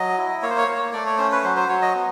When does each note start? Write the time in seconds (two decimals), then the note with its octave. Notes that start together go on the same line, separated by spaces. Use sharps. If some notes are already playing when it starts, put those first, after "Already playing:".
Already playing: F#3 D#5
0.18 E4
0.42 A#3 C#5
0.50 C5
0.58 C#5
0.68 A#3
0.93 A3 D5
1.06 C#5
1.18 C#4 C5
1.32 B4
1.44 F#3 C5
1.56 C5
1.69 F#3 C#5
1.82 D#5
1.95 B3